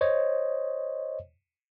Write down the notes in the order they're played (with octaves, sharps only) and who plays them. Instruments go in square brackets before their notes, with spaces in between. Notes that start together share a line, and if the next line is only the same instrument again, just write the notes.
[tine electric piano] C5 C#5 D#5